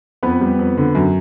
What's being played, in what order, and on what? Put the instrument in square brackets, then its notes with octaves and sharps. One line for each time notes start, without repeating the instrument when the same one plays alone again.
[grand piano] F2 B3 B4
G3
F2
D3
F#2